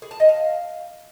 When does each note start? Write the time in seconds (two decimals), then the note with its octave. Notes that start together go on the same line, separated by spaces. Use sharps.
0.02 G#4
0.11 A5
0.20 D#5
0.29 F5